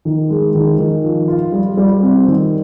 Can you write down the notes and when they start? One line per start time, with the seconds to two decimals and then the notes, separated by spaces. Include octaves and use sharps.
0.05 D#3
0.30 G#3
0.55 D#3
0.78 D#3
1.04 F3
1.28 F4
1.52 G3
1.77 G3
2.02 C4
2.27 D#3